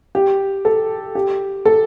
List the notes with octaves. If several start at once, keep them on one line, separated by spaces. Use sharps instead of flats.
G4
A4
G4
A4